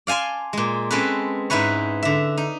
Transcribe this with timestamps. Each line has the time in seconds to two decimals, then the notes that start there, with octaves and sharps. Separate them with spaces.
0.07 D5 F5 G#5 A5 C6
0.53 A#2 G#3
0.91 G#3 C4 C#4 G#4 A4 B4
1.50 G#2 D#4 E4 B4 C#5
2.03 D3 E5
2.37 D#4